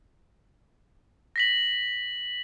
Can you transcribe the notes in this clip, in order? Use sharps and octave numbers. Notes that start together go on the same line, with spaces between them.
A#6 B6 F#7